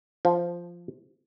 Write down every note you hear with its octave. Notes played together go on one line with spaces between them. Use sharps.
F3